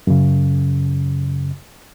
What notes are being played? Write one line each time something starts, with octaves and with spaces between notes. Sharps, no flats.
F#2 C#3